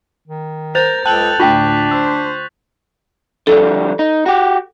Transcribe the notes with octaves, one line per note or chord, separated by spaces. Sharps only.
D#3
A#4 C5 G6 A6 F7
C#2 A4 G5 A5 F#6 F#7
D2 A2 D4 F4 G5 C#6 B6
C5 E6
D3 F3 G3 A4
D#4
F#4 G4